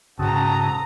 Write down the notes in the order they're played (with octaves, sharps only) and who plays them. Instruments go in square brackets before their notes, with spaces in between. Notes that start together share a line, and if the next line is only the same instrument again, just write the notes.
[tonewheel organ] G#2 D#6 [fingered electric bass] C#3 [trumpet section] C4 F#4 A5 [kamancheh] A4 A#5